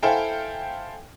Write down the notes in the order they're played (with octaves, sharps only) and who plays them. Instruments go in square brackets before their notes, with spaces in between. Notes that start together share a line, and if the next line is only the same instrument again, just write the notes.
[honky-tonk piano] E4 A4 C5 F5 G5 G#5